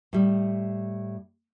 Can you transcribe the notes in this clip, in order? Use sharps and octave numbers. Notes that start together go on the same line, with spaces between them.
A2 G3